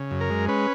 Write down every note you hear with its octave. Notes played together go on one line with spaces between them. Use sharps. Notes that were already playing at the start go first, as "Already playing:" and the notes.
Already playing: C#3
F#2
A#4
G#3
C#4 B4